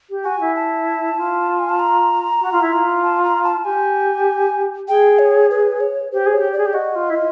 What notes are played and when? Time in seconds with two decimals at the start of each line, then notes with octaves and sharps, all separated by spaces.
0.09 G4
0.24 F#4 G#5
0.40 E4
0.56 A5
1.17 F4
1.60 G#5
1.69 A5
1.80 A#5
2.41 F#4
2.51 F4
2.61 E4
2.72 F4
3.03 A5
3.23 A#5
3.44 A5
3.64 G4 G#5
4.88 G#4 G5
5.19 C#5
5.50 B4
5.80 C#5
6.12 G4 C5
6.26 G#4
6.33 C#5
6.38 G4
6.53 G#4 D5
6.65 G4
6.73 F#4 D#5
6.95 F4
7.09 E4
7.15 F4